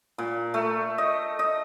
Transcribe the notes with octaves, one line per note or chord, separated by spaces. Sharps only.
A#2
A3
D#5
D#5